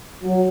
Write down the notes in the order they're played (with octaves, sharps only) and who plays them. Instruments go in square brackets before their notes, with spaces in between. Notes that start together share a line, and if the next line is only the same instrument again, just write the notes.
[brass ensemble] F#3